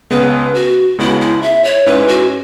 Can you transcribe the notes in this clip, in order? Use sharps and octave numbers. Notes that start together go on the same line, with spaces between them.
C#2 C#3 G#3 B3 B4
F#4
C#2 C#3 G#3 B3 E4
E4
E5
C#5
G#2 G#3 C#4 E4 B4
F#4